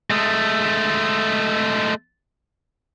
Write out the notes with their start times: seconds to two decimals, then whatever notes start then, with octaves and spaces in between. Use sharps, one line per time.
0.10 G#3 A3